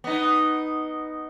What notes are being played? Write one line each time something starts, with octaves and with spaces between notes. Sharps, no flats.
B3 D#4